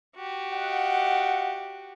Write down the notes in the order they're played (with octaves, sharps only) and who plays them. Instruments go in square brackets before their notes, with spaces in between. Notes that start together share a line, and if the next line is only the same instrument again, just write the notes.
[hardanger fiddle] F#4 G4
[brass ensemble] D#5 F5 F#5